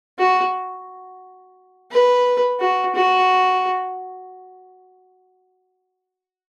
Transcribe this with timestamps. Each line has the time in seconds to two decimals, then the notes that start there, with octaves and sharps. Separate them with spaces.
0.19 F#4
1.91 B4
2.60 F#4
2.95 F#4